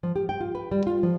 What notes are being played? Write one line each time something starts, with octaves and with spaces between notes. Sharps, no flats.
F3
G4
G5
F4
B4
G3
F4
F3